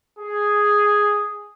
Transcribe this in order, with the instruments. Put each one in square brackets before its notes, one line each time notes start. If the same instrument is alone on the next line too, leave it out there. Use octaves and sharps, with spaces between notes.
[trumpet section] G#4